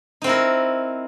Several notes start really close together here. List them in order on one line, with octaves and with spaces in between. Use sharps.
D#4 C4 E4 A#4